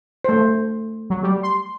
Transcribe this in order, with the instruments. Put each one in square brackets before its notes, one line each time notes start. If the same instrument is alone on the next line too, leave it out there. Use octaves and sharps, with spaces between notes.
[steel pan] A3 C5
[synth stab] F#3
G3
C6